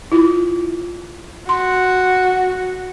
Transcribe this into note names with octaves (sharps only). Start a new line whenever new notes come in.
E4 F4
F#4 C6